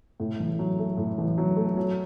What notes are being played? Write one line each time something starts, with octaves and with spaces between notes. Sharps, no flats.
A2
A1
F#3
A3
A2
A1
F#3
A3
F#3